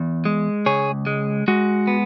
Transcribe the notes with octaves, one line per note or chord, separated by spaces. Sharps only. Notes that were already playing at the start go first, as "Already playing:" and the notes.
Already playing: E2
G#3
C#2 G#4 C#5
G#3
G#3 F#4
B3